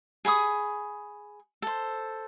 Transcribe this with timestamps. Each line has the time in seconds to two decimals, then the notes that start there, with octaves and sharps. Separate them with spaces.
0.25 G#4 B5 C#6 D#6
1.62 A4 C5